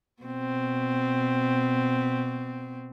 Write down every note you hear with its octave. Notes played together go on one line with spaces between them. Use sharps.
B2 C4